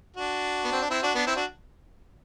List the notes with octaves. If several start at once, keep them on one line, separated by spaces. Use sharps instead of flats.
D4 F#4
B3
C4
D4
C4 E4
D4 F#4
B3 D4
C4 E4
D4 F#4